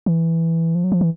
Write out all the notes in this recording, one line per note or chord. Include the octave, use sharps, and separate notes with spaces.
E3
F3
F#3
F3
E3